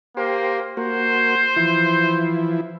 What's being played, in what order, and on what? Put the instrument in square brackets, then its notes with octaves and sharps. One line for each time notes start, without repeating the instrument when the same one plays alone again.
[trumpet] A#3 [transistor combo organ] G4 C5
[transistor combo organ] A#3 F#4 [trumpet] C5
[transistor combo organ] E3 F3 E4